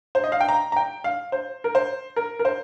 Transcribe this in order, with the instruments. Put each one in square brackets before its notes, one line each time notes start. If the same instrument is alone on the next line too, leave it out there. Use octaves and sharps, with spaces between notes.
[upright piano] C5
D#5
F5
G5
A#5
A#5
G5
F5
C5
A#4
C5
A#4
A#4
C5